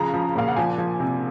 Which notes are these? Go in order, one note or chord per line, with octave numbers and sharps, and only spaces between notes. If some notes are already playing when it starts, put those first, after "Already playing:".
Already playing: C#3 F3 A#5
F3
A#2 F5
F#5
F3 G#5
F3
C3